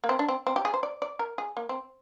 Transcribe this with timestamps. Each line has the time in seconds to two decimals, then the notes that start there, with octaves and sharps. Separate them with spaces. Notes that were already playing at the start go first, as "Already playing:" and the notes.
0.04 A#3
0.09 C4
0.19 D4
0.28 C4
0.47 C4
0.56 G4
0.65 G#4
0.74 C5
0.83 D5
1.02 D5
1.19 A#4
1.38 G#4
1.57 A#3
1.69 C4